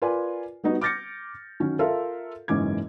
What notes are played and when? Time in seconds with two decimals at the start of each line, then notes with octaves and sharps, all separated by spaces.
0.02 F4 A#4 B4 D5 G#5
0.63 G3 B3 D#4 F#4
0.81 D6 F6 G6 A6 A#6 C#7
1.60 D#3 F#3 C#4
1.79 F4 A4 A#4 E5 F5
2.48 F#1 G#2 E3 C#4 D6 G#6